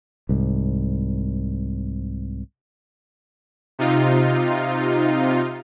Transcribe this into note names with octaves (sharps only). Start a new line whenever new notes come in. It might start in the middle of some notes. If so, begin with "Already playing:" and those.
C2 G#2
C3 D#4 F4